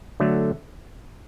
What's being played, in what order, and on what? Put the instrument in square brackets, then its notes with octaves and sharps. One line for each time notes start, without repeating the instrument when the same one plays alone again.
[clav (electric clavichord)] D3 F#3 A3